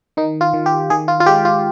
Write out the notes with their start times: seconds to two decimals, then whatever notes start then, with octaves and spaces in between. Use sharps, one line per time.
0.17 D#3 D#4
0.41 F4
0.53 D#3
0.66 G4
0.90 D#3 G#4
1.08 F4
1.20 F4
1.26 G#3 G4
1.45 F4